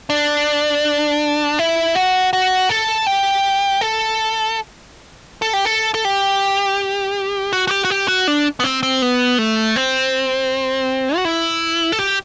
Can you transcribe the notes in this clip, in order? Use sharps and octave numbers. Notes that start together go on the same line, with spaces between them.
D4
E4
F#4
F#4
A4
G4
A4
A4
G4
A4
A4
G4
F#4
F#4
G4
F#4
G4
F#4
D4
B3
C4
C4
B3
A3
C4
F#4
E4
A4
G4